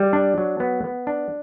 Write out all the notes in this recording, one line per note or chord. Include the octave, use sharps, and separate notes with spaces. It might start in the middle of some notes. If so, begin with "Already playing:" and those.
Already playing: G3
D4
F#3
B3
B3
D4